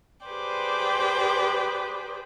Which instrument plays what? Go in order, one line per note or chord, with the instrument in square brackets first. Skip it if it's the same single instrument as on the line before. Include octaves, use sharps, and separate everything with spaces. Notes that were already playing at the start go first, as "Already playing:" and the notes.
[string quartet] G4 G#4 B4 C5 D5 G5